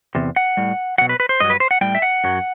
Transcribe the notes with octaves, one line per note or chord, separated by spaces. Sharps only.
E2 C3
F#5
A2 G3
B2 F#3 F#5
B4
B4
C5
G2 F#3 D#5
B4
C5
F#5
A2 G3 G5
E5
F#5
F#2 F#3